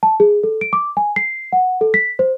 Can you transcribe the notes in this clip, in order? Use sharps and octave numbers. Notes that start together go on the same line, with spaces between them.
A5
G#4
A4
D7
D6
G#5
C7
F#5
A4
B6
C5